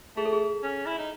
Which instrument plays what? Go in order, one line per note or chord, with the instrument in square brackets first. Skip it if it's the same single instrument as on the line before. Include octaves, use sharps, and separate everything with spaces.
[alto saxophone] A3 [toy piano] G#4
[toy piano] A4
G#4
[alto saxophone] C#4
E4
D#4